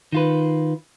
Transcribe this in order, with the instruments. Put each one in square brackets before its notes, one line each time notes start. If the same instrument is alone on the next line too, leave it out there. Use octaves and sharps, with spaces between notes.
[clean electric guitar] D#3 F4 B4